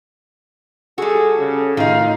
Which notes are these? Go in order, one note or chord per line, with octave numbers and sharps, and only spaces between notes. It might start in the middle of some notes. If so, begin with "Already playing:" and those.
G3 F#4 G#4 A4
C#3
A2 D#3 D#4 F4 F5